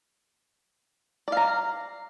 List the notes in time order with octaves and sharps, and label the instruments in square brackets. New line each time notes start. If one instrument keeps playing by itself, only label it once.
[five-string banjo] D5
F5
A#5